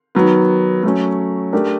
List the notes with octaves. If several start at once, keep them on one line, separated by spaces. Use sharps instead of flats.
D#3 F#3 B3
F#3 A3 C#4
A3 D4 G4 A#4